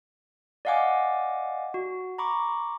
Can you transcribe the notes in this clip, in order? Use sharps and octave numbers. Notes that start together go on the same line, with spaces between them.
D5 D#5 F5 F#5 G#5 D6
F#4
A#5 B5 C#6 D6